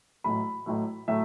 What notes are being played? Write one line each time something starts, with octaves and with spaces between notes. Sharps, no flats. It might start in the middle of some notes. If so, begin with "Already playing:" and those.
A1 A2 F#3 A3 B5
A1 A2 F#3 A3
A2 F#3 A3 E5